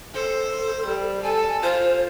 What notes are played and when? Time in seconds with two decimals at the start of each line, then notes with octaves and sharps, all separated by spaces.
0.15 A4 C5
0.86 G3
1.24 A4 G#5
1.63 F4 C5